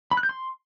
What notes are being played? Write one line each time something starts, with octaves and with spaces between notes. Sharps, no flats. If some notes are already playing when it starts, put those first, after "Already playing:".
B5
F#6
G6
C6